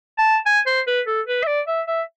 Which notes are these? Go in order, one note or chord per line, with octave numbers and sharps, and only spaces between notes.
A5
G#5
C5
B4
A4
B4
E5
D5
E5
E5